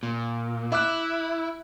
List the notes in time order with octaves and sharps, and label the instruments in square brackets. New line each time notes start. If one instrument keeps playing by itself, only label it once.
[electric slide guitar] A#2
[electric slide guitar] E4 [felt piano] E5 D6 F#6